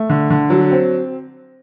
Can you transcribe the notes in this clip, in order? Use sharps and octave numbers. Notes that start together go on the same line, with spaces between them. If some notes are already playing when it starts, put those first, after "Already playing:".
Already playing: A3
D3
D3
F#3
C4